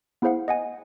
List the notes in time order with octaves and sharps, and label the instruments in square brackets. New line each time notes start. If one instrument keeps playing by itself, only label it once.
[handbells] B3 E4 G#4 C5 F5 F#5
D#5 F#5 G#5